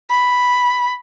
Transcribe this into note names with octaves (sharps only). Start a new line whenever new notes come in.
B5